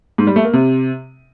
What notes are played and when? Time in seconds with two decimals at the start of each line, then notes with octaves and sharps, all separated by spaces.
0.18 G#2
0.27 G3
0.36 A3
0.45 A#3
0.53 C3